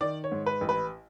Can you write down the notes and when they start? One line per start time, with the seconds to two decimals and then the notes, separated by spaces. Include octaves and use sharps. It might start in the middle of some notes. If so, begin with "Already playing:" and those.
0.01 D#3 D5
0.24 C#5
0.32 G#2
0.46 B4
0.61 A1
0.69 B4